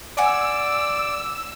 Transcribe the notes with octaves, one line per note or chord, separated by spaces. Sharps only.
D5 F#5 G#5 D6 E6